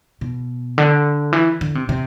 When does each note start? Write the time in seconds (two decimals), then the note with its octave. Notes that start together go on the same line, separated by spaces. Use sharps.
0.21 B2
0.78 D3
1.33 E3
1.61 D3
1.75 C3
1.89 C3